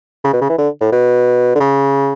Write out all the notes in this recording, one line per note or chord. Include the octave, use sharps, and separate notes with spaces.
C#3
B2
C#3
E3
D3
A2
B2
D3
C#3